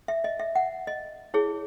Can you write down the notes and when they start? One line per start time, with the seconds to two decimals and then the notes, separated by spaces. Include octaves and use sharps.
0.08 E5
0.24 D#5
0.39 E5
0.55 F#5
0.87 D#5
1.34 E4 G#4 C#5